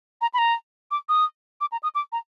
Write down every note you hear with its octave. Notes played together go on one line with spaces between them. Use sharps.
A#5
B5
A#5
D6
D#6
D6
A#5
D#6
D6
A#5